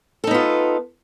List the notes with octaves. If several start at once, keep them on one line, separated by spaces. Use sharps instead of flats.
B3 D#4 F4 A4